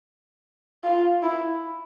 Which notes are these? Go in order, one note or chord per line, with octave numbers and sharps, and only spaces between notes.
F4
E4